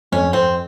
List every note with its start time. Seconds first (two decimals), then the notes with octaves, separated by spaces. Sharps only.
0.12 F2 C#4
0.33 F2 C4